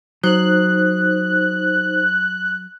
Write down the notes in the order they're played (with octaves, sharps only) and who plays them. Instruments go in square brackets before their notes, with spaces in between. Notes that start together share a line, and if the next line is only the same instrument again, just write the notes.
[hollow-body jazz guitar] F#3 [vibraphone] D#4 C5 [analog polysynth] F#6